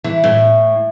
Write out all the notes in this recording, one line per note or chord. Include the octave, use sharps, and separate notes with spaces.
E3
A2